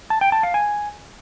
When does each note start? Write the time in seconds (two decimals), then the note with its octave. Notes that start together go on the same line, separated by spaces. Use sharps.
0.10 A5
0.21 G5
0.32 A5
0.43 F5
0.54 G#5